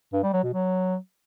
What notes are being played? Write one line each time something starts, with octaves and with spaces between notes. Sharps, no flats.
G2
G3
F#3
B2
F#3